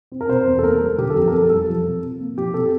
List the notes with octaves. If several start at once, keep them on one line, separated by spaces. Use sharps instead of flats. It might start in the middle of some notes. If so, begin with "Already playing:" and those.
C4
A#4
C3 C5
E2
A4
A#3 A#4
G3
D3 G4
A4
F2 G4
A#4
F2 A4
G3 A4
F3
C3
C3
A#3
F3 G4
C3 A4